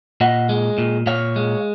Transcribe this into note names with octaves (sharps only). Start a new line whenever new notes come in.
A#2 D#5 F#5
G#3
A#2
A#2 C#5 F5
G#3